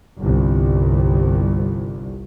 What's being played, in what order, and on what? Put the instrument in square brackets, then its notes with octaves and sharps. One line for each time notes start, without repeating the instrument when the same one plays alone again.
[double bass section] G1 C2